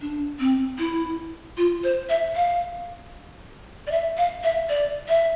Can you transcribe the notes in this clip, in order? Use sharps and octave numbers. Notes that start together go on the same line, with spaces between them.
D4
C4
E4
F4
C5
E5
F5
D5
E5
F5
E5
D5
E5